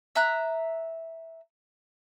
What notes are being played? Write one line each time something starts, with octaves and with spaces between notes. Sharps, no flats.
E5 A#5 F#6